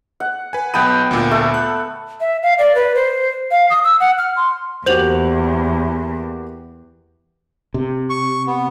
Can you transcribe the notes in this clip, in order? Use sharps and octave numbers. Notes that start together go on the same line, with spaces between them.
F#5
B4 G#5
B1 B3 G5 A5 D#7
D2 A#2
A3 A4
F#6
E5
F5
D5
B4
C5
F5
D#6
E6
F#5
F6
C6
E2 A#3 F#4 G4 C5 F7 F#7
C3
C#6
B3